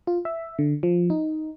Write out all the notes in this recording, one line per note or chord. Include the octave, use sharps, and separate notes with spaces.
F4
E5
D3
F3
D#4